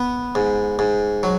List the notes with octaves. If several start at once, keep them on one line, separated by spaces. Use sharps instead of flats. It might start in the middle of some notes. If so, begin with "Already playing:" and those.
Already playing: B3
G#2
G#2
F#3